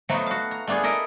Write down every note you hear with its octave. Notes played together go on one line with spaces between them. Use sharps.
F3 F#3 A3 B3 D#4
F#4 F5
A#5
A3 B3 D4 F4 G#4
E4 A4 A#4 D#5 E5